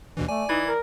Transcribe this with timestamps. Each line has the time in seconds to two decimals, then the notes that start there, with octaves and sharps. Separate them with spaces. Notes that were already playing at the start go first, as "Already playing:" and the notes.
0.17 D#2 B2 E3 D4
0.29 A3 D5 G#5
0.49 E3 D#4 G#6
0.66 A#4